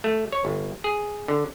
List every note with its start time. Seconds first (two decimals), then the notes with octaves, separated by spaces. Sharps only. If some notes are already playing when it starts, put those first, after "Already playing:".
0.04 A3
0.32 C#5
0.45 G1
0.84 G#4
1.28 D3